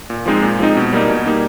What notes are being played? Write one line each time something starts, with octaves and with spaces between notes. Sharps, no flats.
A#2
F3 G#3 C4 D#4
A#2
F3 G#3 C4 D#4
B2
G3 A#3 D#4
B2
G3 A#3 D#4